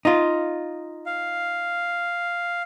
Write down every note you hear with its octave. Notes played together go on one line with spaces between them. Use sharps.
D#4 F4
F5